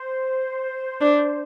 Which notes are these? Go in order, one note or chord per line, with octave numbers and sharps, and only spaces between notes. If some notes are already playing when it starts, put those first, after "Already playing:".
Already playing: C5
D4